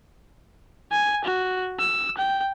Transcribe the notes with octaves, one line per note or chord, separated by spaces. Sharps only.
G#5
F#4
E6
G5